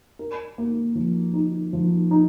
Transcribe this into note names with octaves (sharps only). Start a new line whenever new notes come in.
A#4
A#3
F3
D#4
F3
D#4